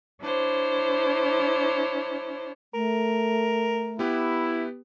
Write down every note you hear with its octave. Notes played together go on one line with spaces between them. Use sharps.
D4 E4 C5 C#5
A3 A#4
B3 E4 G4 B4